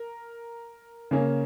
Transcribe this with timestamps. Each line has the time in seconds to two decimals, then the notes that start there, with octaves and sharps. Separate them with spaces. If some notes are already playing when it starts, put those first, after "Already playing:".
Already playing: A#4
1.11 C#3 A#3 C#4